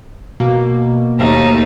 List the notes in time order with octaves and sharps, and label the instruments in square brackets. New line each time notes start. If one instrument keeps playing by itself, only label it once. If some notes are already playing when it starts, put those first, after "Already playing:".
[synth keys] B2 A#3
[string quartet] D#2 A3 D#4